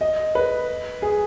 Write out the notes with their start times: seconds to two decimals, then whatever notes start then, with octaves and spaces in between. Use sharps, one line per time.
0.01 D#5
0.35 B4
1.02 G#4